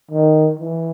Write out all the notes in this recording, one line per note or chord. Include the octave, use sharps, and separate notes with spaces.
D#3
E3